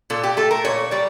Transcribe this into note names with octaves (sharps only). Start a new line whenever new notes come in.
A#2 A4
G4
A3 A4
A#4
A#2 C#5
G3 D5